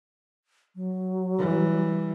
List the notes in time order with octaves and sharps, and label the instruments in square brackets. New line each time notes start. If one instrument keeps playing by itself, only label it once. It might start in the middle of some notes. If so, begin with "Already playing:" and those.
[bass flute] F#3
[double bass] E3 G3